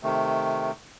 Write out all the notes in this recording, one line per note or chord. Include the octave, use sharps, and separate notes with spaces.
C3 D#3 A3